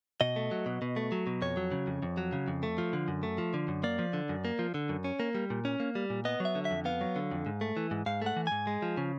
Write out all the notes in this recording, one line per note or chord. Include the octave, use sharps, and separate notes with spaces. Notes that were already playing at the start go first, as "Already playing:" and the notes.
B2 D#5
A3
F#3
B2
B2
A3
F#3
B2
F2 C#5
F#3
C#3
F2
F2
F#3
C#3
F2
A3
F3
D3
F#2
A3
F3
D3
F#2
A#3 D5
F3
D3
F#2
A#3
F3
D3
F#2
C#4
A#3
G3
A#2
C#4
A#3
G3
A#2
B3 D#5
F#3
E5
D3
E5
F2
B3 F5
F#3
D3
F2
G#2
A3
E3
G#2
G#2 F5
A3 F#5
E3
G#2 G#5
G#3
F3
C#3